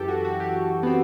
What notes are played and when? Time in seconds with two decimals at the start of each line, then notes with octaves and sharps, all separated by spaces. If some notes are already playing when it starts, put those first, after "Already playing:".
Already playing: F#2 E3 G4 A4
0.08 F#4
0.25 F#4
0.40 G4
0.83 B3
0.87 C4